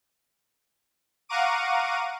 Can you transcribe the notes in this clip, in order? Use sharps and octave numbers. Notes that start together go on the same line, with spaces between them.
F5 F#5 A#5 C#6 D6 D#7